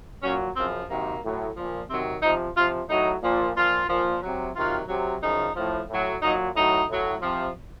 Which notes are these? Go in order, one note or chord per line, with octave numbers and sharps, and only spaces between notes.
A#2 F#3 C#4
F#2 C#3 F3 C4
C3 D#3 F#3 A#3
A2 F#3
A#2 F3
C3 D#3 F#3 C4
C3 F3 D#4
C3 F3 F4
A2 F#3 D#4
A#2 F3
A#2 F3 F4
A#2 F3
C3 F#3
C3 D#3 F#3 F4
C3 F#3
F#2 C#3 F3 D#4
A2 F3
A2 F#3
A#2 F#3 D#4
A2 F#3 D#4
A2 F#3
C3 F3